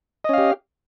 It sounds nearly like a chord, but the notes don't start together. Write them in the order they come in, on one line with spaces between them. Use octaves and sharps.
D#5 C#4 F5 G4